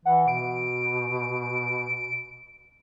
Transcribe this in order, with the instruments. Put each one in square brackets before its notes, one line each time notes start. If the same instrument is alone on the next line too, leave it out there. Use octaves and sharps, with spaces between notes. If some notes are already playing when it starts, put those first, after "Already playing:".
[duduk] E3 [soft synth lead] F#5
[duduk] B2 [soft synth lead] D7